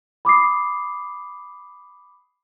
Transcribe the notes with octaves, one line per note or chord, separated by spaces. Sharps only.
B5 D6 D#6 C7